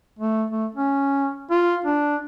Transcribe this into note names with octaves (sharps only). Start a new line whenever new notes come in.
A3
A3
C#4
F4
D4